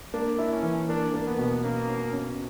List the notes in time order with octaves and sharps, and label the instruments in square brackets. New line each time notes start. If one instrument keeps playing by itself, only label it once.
[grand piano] A#3 [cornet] D4
[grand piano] E4
[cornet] C#4
[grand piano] E3
[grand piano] A#3 [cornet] D4
[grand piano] A#3
[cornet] B3
[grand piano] B2
[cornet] A#3 [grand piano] C#4
[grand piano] C#4
C#4